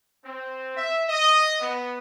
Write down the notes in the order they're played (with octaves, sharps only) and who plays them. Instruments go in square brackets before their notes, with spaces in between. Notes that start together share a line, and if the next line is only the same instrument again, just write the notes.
[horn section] C4
E5
D#5
B3